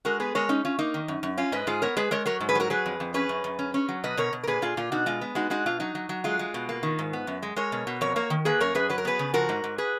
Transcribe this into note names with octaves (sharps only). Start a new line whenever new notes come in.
G#3 F#4 A#4
B3 G#4 B4
G#3 A#4 C#5
C#4 D#4
C#4 F4
A#3 D#4
D#3
F#2
F#2
C#4 F4
G#2 B4 D#5
G#2 F4 G#4
B3 A#4 C#5
G#3 G#4 B4
G#3 A#4 C#5
F#3 A#4 C#5
G#2
G#4 B4
F#3 F#4 A#4
F#3 G#4 B4
F2
F2
C#4 G#4 B4
F#2
F#2
C#4
C#4
F#3
B2 B4 D#5
B2 A#4 C#5
B2
A#4
A#2 G#4 B4
A#2 F4 G#4
A#2 F4
B2 D#4 F#4
G#3 F4
B3
G#3 D#4 F#4
G#3 D#4 F#4
B2 F4
F#3 D#4
F#3
F#3
G#3 F4
G#3
B2
A#3
D#3
G#2
B3
F#2
G#3
G#3 A#4 C#5
B2
B2
F2 A#4 C#5
A#3 A#4 C#5
D#3
A#3 G#4 B4
F#2 A#4 C#5
F#2 G#4 B4
F#3 B4
A#4
B3 G#4 B4
C#3
F3 F#4 A#4
G#2
G#2
G#4 B4